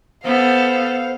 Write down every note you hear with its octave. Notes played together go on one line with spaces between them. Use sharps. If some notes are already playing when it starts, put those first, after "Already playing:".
B3 A4 C5 F5